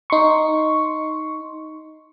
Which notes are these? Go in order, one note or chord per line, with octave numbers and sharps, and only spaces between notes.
D#4 C6 C#6